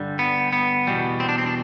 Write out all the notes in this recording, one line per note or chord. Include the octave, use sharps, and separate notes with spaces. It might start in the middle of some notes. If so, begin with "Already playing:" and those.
Already playing: G2 D3 G3
B3
B3
E2 B2 G3
C4
D4
C4
D4